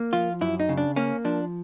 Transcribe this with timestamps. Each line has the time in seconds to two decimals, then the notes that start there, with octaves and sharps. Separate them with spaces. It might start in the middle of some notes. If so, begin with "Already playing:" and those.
Already playing: A#3
0.13 F3 F4
0.41 F#2 E4
0.60 D#4
0.69 C#3
0.77 D4
0.96 A#3 C#4
1.25 F3 D4